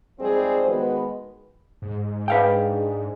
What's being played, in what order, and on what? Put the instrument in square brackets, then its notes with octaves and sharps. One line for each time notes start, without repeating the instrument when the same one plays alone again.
[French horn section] G#2 F3 G3 C4 G#4 C5
D#3 G#3 B3 F#4 B4
[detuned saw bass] G#2
[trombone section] D4 D#4 G#4 [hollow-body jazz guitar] B4 F5 G5